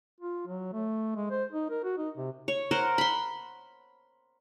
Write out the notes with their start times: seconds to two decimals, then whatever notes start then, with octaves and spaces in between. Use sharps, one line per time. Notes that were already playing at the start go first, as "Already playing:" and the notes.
0.20 F4
0.47 F#3
0.72 A3
1.16 G#3
1.31 C5
1.52 D#4
1.70 A#4
1.84 F#4
1.97 D#4
2.17 C3
2.48 C#5
2.71 A#4 C5 F#5
2.98 B5 C6